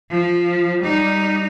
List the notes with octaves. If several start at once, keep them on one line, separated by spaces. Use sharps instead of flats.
F3
G3 D#4